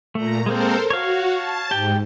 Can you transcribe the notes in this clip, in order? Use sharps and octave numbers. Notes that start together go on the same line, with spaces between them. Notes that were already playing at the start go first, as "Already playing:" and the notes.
A#2 A3 A#5
G#3 A#3 C4 A4 A#4 C5
F#4 C#5 F5
A5
G#2 G4 G5